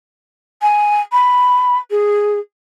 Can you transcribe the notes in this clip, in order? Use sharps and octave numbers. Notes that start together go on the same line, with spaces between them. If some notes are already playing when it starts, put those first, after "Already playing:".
G#5
B5
G#4